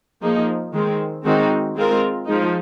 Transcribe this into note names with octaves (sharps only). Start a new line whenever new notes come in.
F3 A#3 D#4 G#4
D#3 G#3 C4
D#3 G#3 C4 D#4 F#4
G#3 C4 F4 A#4
F3 G#3 D#4